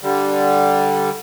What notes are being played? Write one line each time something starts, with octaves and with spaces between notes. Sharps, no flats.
D3 G3